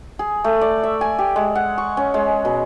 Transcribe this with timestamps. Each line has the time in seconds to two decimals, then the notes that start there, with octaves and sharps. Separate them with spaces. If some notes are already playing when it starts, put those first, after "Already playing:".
0.19 G#4
0.44 A3
0.61 D5
0.83 E5
1.01 G#5
1.19 G4
1.36 G#3
1.55 F#5
1.78 C#6
1.97 C#4
2.14 G#3
2.45 B2